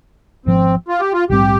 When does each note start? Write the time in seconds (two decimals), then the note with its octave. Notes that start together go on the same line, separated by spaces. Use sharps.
0.46 G#1 G#2 F3 C4
0.88 F4
1.00 G4
1.13 F4
1.29 A#1 G#2 G3 C4 G4